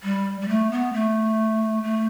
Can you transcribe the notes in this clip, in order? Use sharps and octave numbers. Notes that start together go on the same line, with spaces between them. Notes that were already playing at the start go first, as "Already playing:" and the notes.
G3
G3
A3
B3
A3
A3